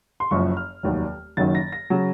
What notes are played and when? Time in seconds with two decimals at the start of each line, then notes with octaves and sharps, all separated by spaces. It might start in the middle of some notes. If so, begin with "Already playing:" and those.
0.20 C6
0.31 F#1 F#2 F3 C#6
0.57 F6
0.83 F1 D#2 D#3 F#3
1.37 F#1 F#2 D#3 F#3 A6
1.55 A#6
1.72 A#6
1.90 C#3 F#3